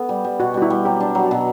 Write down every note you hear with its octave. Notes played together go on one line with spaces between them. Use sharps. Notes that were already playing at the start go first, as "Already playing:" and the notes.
Already playing: B3 A4
G3
G3
B2 F#4
G3 F#4
E4
G3
F#3 G4
D4
F#3
B2